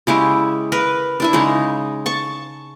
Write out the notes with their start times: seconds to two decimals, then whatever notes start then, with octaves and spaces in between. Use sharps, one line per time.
0.07 C#3 G#3 E4 G4
0.72 A#4 B4
1.20 D4 E4 E5
1.33 C#3 G#3 D#4
2.06 A5 C#6